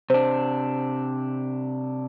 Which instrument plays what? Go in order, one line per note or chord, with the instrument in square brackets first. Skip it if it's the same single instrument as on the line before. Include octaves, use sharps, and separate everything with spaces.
[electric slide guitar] C3 D4 [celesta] C5